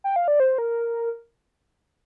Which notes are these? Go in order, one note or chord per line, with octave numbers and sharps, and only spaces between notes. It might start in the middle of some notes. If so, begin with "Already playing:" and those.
G5
F5
D5
C5
A#4